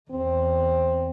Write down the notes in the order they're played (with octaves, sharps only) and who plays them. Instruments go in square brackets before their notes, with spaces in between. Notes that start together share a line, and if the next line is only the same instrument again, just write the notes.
[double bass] E2 [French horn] C4